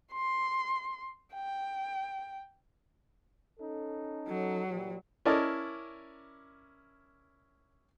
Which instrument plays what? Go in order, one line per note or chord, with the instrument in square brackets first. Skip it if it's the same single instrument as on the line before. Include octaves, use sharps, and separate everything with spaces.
[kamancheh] C6
G5
[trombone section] C#4 D#4 A4
[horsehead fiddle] F#3
[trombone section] A#2 E3 G3
[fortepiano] C#4 E4 A#4 D5 D#5 A5